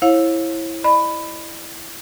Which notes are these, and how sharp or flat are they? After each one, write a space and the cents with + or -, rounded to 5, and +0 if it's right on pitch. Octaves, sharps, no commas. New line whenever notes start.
E4 +0 C#5 -35 F5 +25
D#5 -45 B5 +10